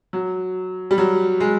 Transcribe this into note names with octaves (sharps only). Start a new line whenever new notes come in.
F#3
G3
F#3
G#3